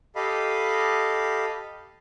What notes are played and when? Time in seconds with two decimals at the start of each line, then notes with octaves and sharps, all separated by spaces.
0.16 G4 A4 D#5 F5 B5